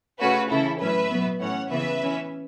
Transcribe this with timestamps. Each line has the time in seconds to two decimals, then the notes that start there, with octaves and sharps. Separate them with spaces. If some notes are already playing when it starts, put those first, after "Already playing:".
0.20 C#3 A3 C#4 F#4 B4
0.50 C#3 E3 C#4 E4 A4
0.80 A2 F#3 C#4 B4 E5
1.10 B2 F#3 B3
1.40 A2 E3 A3 C#4 C#5 F#5
1.70 C#3 E3 B3 B4 E5
2.01 E3 C#4